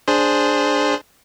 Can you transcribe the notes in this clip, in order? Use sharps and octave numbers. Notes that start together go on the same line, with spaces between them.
D4 G#4 C5